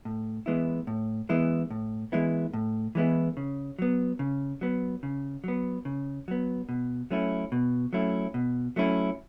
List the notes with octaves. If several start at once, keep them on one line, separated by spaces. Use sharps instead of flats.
A2
E3 G#3 B3 E4
A2
E3 G#3 B3 E4
A2
E3 G#3 B3 E4
A2
E3 G#3 B3 E4
C#3
F#3 B3
C#3
F#3 B3
C#3
F#3 B3
C#3
F#3 B3
B2
F#3 A3 C#4 E4
B2
F#3 A3 C#4 E4
B2
F#3 A3 C#4 E4